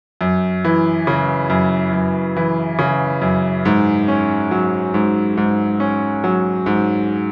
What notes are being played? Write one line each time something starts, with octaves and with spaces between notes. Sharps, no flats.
F#2
E3
C#3
F#2
F#2
E3
C#3
F#2
G#2
C#4
F#3
G#2
G#2
C#4
F#3
G#2